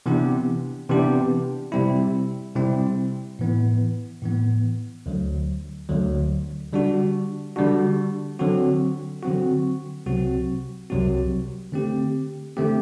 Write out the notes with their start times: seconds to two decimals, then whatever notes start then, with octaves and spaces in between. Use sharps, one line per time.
0.06 C3 E3 B3 D4 G4
0.89 C3 E3 B3 D4 G4
1.72 C3 G3 C4 E4
2.55 C3 G3 C4 E4
3.39 A2 E3 B3
4.22 A2 E3 B3
5.06 D2 D3 F#3
5.89 D2 D3 F#3
6.73 D3 G3 D4 F#4
7.56 D3 G3 D4 F#4
8.39 D3 F#3 C4 F#4
9.23 D3 F#3 C4 F#4
10.06 C2 C3 F#3 C4 F#4
10.90 C2 C3 F#3 C4 F#4
11.73 D3 A3 C4 G4
12.57 D3 A3 C4 G4